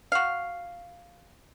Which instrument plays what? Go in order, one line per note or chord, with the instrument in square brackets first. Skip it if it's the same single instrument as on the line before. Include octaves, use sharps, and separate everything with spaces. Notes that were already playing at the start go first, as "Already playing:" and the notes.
[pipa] F#4 F5